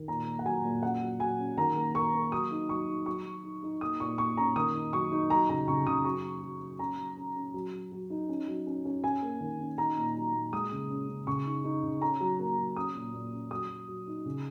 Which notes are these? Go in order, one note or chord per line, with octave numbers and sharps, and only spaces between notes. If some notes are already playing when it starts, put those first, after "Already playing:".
Already playing: D#3
A#2 A#5
A#3
F#5
F#3 G#5
A#2
C#4 F#5
F#3
F#3 G#5
C#4
D#3 A#5
A#3
A#3 C#6
A#3
F#3 D#6
D#4
F#3 C#6
D#4
F#3 C#6
F#3
D#4
D#4
A#3 D#6
A#2 C#6
A#2 C#6
C#4 A#5
D#3 D#6
D#4
F#3 C#6
D#4
F#3 A#5
C#3 A#5
C#3 C#6
C#3 D#6
F#3 C#6
F#3
F#3
F#3
C#4 A#5
F#3
C#4
C#4
F#3
F#3
F#3
D#4
C#4
F#3
C#4
C#4
C#4 G#5
A#3
D#3
C#4
D#4 A#5
A#2
F#3
A#2
G#3 D#6
C#3
C#4
C#3
C#3 C#6
D#4
D#4
C#3
C#4 A#5
F#3
A#3
F#3
C#4 D#6
A#2
A#2
C#4
F#3 D#6
F#3
F#3
D#4
C#3